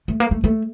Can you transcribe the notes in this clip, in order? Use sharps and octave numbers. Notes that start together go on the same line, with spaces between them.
A3
A#3
A3
A3